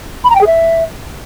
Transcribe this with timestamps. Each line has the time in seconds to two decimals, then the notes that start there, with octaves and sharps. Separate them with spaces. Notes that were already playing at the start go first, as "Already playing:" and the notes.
0.24 B5
0.30 A#5
0.35 G5
0.41 G#4
0.47 E5